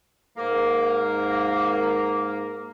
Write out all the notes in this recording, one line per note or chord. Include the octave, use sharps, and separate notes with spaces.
G#2 A#3